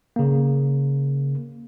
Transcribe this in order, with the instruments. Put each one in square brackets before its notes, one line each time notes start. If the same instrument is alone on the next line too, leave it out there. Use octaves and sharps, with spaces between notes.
[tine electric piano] C#3 A#3